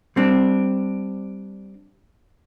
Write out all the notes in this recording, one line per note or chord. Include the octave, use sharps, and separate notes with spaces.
G3 C4 D4